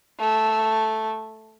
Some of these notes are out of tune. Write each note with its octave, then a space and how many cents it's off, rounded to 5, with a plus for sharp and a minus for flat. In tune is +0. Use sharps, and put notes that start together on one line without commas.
A3 -5